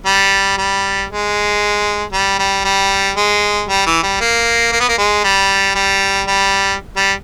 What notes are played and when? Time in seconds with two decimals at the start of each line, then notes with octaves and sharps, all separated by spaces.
0.06 G3
0.58 G3
1.10 G#3
2.13 G3
2.39 G3
2.65 G3
3.17 G#3
3.69 G3
3.86 E3
4.03 G3
4.21 A#3
4.72 A#3
4.80 B3
4.89 A#3
4.98 G#3
5.24 G3
5.75 G3
6.28 G3
6.97 G3